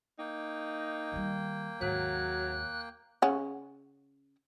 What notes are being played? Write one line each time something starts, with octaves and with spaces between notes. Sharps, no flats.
A#3 D#4 G5
D#3 G3
D#2 G#2 F#3 F#6
C#3 C#4 F#5